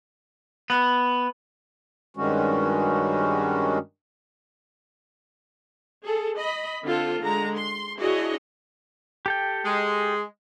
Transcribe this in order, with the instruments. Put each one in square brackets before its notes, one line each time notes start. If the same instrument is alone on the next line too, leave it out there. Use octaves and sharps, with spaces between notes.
[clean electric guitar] B3
[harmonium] G2 D#3 G3 G#3 C#4 F#4
[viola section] G#4 A4
D#5 B5
D3 C4 F4 A4
D3 G#3 A#5
C6
D4 E4 F#4 G#4 C#5 D#5
[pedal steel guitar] G4 A4 G5
[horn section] G#3